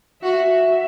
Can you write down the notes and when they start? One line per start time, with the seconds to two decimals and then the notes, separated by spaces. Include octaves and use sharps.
0.22 F#4 E5